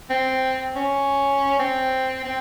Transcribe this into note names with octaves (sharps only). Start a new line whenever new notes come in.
C4
C#4
C4
C4